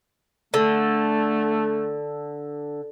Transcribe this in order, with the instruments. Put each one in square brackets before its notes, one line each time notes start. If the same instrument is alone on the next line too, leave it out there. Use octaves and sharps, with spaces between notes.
[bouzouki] D3 [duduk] A3